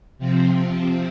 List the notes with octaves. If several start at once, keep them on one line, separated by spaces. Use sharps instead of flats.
C3 F3 C4